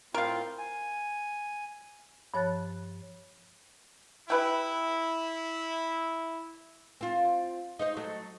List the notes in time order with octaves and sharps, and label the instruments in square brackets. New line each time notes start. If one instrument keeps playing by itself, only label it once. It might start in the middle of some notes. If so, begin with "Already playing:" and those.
[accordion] A2 C4 F4 [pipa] A#4 F5
[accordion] G#5
[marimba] G2 F3 C#5 A5 F#6 A6
[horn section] E4 [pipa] G4 B4 G5
[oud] C4 F4
D#4 C5 D#5
F#3 A3